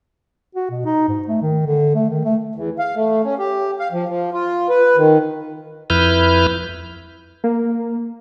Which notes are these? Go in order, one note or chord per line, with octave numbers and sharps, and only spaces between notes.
F#4
B2
D#4
G#2
A3
D#3
D3
A3
D#3
A3
E2
F5
A3
C#4
G4
F5
F3
F3
F4
B4
D#3
F2 E4 B4 F6 G6
A#3